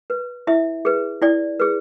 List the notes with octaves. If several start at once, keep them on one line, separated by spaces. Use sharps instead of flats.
B4
E4 E5
G#4 B4
E4 D5
G#4 B4